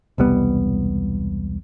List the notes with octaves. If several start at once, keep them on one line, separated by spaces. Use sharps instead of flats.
E1 C2 G3 B3